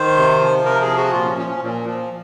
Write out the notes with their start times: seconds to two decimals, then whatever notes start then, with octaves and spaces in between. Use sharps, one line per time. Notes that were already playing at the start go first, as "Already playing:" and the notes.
Already playing: D#3 C5
0.17 C3
0.41 F3
0.65 C3 A#4
0.81 G#4
0.89 F3
0.97 F#4
1.13 A#2 F4
1.26 C#4
1.38 F3 C#4
1.50 C#4
1.62 A#2
1.86 F3